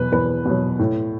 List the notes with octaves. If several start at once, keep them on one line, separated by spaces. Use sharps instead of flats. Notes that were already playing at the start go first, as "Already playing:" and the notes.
Already playing: E2 B2 F#3 B4
E2 B4
B2 F#3
A2